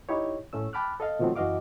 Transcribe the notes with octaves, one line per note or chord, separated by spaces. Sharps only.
D#4 E4 G4 C#5
A2 A3 C#4 E6
G5 A5 B5 D6 F6 F#6
A4 D#5 F5
B2 D#3 F3 F#3 A3 C4
F#2 E3 F#4 D#5 F5 D6